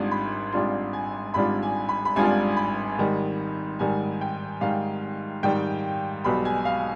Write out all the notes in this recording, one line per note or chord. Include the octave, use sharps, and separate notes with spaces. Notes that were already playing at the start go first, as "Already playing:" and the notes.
Already playing: G#1 G#2 G3 D4 F4 C6
B5
G#1 G#2 G3 D4 F4 C6
G#5
G#1 G#2 G3 D4 F4 B5
G#5
B5
B5
G#1 G#2 G3 D4 F4 G#5
B5
G#2 D#3 G3
G#2 D#3 G3 G#5
G5
G#2 D#3 G3 F5
G#2 D#3 G3 G5
B1 B2 G3 B5
G#5
F5